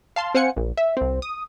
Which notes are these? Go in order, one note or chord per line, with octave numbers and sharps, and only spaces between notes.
F5 A5 C6
C4 C5 F5 F#5 G#5 C#7
A#1
E5
C2 C4
D#6